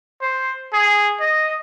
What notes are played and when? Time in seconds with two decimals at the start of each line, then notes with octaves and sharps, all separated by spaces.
0.21 C5
0.73 G#4
1.20 D#5